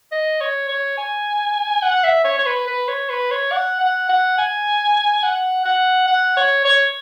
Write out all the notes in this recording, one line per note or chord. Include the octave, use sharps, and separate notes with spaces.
D#5
C#5
C#5
G#5
F#5
E5
C#5
C#5
B4
B4
C#5
B4
C#5
F#5
F#5
F#5
G#5
F#5
F#5
F#5
C#5
C#5